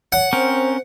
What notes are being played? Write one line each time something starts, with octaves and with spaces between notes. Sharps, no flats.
C#5 F#5
C4 C#4 A#4 C5